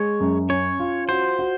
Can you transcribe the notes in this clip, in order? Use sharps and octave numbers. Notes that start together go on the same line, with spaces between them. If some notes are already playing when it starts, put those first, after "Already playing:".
Already playing: G#3 C#5
F#2
C#4 C#5
F4
F#4 C5
F#4